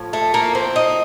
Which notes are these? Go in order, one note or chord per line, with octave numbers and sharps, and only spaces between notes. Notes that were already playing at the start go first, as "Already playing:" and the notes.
Already playing: A2 F3
A3
A#3
C4
D#4